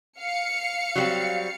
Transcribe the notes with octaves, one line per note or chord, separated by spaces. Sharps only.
F5 C#7
F#3 G3 C4